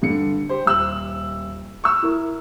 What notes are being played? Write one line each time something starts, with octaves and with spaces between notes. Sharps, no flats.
G2 D3 C#7
G4 C5
D#1 E6 F#7
C#6 E6 F6
E4 A#4